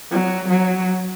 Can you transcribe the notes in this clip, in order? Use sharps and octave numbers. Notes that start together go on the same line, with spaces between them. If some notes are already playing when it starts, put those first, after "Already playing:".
F#3
F#3